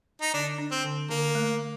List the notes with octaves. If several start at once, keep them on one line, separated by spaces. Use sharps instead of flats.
D#4
D3 D4
D4
C4
D3
D3 A#3
A3